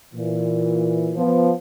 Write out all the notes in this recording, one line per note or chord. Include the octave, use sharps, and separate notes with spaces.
A#2 E3
F3 B3